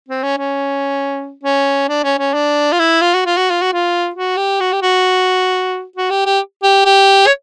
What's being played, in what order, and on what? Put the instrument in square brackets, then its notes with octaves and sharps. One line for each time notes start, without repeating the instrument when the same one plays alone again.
[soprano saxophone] C4
C#4
C#4
C#4
D4
C#4
C#4
D4
F4
E4
F4
F#4
F4
F#4
F4
F#4
F4
F#4
G4
F#4
G4
F#4
F#4
G4
G4
G4
G4
C#5